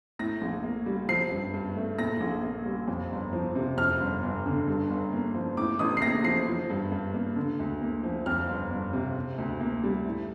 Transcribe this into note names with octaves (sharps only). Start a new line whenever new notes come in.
A2 A#6
A#1
A#3
G3
F3 C7
G2
G2
A3
A#2 A#6
A#1
A#3
G3
F2
G1
F3
C3
F2 F6
G1
G1
D3
G2
G1
A#3
F3
A2 D6
A1 D#6
C7
A#3 A#6
F3 C7
F3
G2
G2
A#3
D3
D2
A#3
F3
F2 F6
G1
G1
C3
C3
D2
A#3
G3
A2